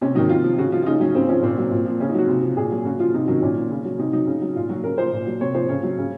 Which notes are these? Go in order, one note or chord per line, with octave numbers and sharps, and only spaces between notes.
C3 C#4
D#3 F#3 D#4
C3 F4
F3
C#3 F#4
F3 F4
F4
C#3 D#4
F#3 C#4
C#3 C4
F3 C#4
A#2 C4
F#3
A#2
F3
C#3 C#4
D#4
F#3 F#4
C3
F3
A#2 G#4
F#3
C#3 F#4
F3 F4
C3 D#4
D#3 F#3 C#4
A#2 C#4
F3
C#3
F#3
C3 D#4
F#3 D#4
C#3
F#3
A#2 F4
F#3 F#4
C#3 A#4
F3 C5
A#2
F#3
C3 C#5
F3 C5
C#3 C#5
F#3
C#3